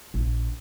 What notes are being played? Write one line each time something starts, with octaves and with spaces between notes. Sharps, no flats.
A#1